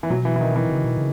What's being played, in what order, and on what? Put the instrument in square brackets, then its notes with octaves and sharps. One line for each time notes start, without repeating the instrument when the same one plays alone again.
[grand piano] E3
[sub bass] B2 [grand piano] F#3
[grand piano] E3
E3
D#3
E3
[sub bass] C#3
B2
C#3